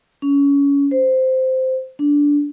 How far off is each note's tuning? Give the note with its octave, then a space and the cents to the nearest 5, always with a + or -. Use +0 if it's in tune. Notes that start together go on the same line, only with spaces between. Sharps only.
C#4 +25
C5 -10
D4 -15